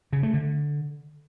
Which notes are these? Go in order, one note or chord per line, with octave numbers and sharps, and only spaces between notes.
C#3
A3
D3